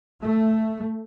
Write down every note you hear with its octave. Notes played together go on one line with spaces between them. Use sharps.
A3